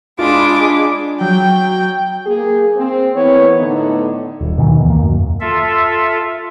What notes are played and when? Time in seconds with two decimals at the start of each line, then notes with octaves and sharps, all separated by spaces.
0.19 G#3 D4 F4 F5 B5 D6
1.21 F#3 G5
2.25 A#3 G#4
2.76 C4
3.14 E3 A#3 B3 C#5
3.56 A2 D3 B3 D#4
4.41 D#1
4.58 B2 D#3 E3
4.86 D#2 A#3
5.00 F#2
5.41 F4 A4 E5